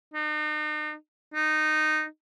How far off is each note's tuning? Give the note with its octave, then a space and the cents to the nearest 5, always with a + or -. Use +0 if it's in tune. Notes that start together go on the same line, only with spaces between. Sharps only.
D#4 -40
D#4 -15